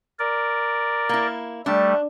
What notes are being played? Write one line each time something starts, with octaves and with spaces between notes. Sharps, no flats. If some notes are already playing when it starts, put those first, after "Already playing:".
A#4 D5
A#3 E4
G3 A3 D4